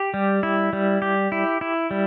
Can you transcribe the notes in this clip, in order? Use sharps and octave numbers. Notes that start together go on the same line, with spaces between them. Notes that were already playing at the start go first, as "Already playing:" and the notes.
Already playing: G4
G3
E4
G3
G4
E4
E4
G3